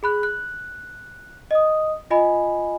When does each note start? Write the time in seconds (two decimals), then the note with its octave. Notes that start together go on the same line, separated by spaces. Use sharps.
0.03 G#4 B5 F#6
0.23 F#6
1.51 D#5 D#6
2.10 F4 D#5 G#5 B5